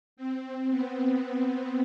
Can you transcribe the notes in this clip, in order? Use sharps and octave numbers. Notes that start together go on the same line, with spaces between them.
C4
B3